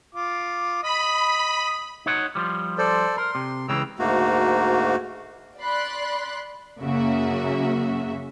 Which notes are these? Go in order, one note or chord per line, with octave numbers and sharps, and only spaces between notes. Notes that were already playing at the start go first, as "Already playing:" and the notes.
F4 D6
D#5 B5 D#6
D#4 C#5 F#5
F3 G3
A4 C5 D5
A#4 C6
C3
C#2 C#3 E3 G5 A#5 E6
D2 G#2 A3 A#3 F#4
D5 B5 C6 F#6
F#2 C#3 A#3 F#4 E5